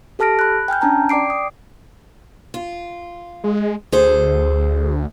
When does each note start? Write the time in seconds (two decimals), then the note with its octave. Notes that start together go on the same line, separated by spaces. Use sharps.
0.19 G4 A4 A5 F6 A#6 D7
0.39 B5 F#6
0.68 G5 G#5 F6 G6
0.81 C#4 D4 A5 A#5
1.09 D5 G5 D6 C7 D7
1.30 D#6
2.54 F4
3.44 G#3
3.92 D2 G#4 A4 C5